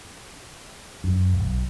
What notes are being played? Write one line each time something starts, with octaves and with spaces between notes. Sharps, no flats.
F#2
D1
B1